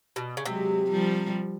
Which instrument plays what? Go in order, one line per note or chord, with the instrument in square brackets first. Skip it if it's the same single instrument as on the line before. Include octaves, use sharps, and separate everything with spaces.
[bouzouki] B2
C#3
[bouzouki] C3 [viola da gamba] F#3 G#3
[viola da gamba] F3 G3